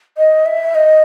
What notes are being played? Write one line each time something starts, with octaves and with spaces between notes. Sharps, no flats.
D#5
E5
D#5